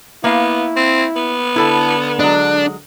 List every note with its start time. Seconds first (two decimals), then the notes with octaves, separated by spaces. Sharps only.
0.24 A#3 B3 E4 F5
0.76 C4
1.16 B3
1.56 D3 E4 A4 A5
2.19 F#3 G#3 D4